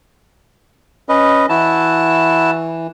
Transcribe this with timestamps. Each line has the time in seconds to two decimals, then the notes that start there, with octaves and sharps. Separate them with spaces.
1.09 C#4 B4 D#5
1.49 E3 E4 F#4 A5